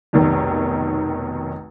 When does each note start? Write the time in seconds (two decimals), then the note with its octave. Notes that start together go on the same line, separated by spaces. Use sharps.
0.13 F1 B1 D#3